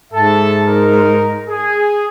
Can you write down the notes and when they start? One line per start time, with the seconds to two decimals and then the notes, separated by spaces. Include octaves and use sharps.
0.13 G#2 A4 E5 A5
0.68 D#4 A#4
1.48 G#4